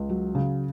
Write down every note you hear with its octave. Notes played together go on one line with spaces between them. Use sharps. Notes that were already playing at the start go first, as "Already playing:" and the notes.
Already playing: C#2
F#3
C#3